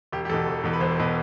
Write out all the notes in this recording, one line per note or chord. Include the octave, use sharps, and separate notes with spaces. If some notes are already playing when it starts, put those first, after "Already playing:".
E1 G4
G4
E2 B2 A4
E1
E2 B2
B4
E1 C5
B2